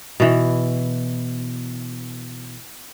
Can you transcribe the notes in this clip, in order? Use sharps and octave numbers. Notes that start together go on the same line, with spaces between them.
B2 E3